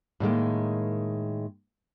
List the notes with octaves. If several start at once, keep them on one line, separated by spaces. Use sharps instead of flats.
A2 D#3 G#3 A#3